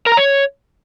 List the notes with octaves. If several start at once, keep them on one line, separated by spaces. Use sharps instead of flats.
A#4
A#5
C#5